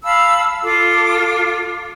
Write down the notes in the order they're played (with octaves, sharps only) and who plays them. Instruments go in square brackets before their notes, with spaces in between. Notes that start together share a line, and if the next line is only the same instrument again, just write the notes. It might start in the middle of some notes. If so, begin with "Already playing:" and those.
[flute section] F5 A5 B5 E6
F4 A4 D6